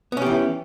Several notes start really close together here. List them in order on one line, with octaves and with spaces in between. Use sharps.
B3 C#4 G4 E3